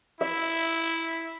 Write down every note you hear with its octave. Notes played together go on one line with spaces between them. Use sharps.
E4 E5